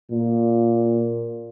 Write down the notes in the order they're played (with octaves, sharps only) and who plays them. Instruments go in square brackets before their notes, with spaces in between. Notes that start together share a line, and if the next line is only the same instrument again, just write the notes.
[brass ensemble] A#2